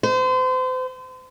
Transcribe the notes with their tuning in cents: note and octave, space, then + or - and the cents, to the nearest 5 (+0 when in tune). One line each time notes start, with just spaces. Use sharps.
C5 -35